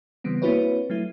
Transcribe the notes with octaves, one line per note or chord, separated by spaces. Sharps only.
C#3 E3 G3 B3 C4
A#3 C4 E4 F#4 B4 C#5
F#3 A3 E4